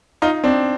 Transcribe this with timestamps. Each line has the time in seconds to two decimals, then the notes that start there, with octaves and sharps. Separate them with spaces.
0.22 D#4 F4
0.44 C4 D4